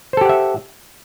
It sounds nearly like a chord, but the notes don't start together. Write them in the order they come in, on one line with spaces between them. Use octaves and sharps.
C5 A4 G4 F#5 E5